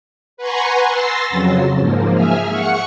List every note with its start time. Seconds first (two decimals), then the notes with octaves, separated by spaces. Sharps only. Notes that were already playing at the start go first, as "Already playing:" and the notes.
0.37 B4 F#5 G#5 A#5 C6 C#6
0.89 C6 E6 A6 A#6 C7
1.30 F2 C#3 F#3
1.78 G#2 F3 A#3
2.13 G#4 E5 G#5 F6
2.50 F#5 C#6 C#7